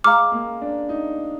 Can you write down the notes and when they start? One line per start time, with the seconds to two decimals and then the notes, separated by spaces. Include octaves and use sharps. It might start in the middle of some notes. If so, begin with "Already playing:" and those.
0.04 G#3 F5 A#5 D6 F6
0.32 A#3
0.62 D4
0.89 D#4